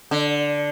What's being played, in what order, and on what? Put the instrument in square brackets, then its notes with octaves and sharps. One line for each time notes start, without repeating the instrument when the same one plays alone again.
[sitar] D3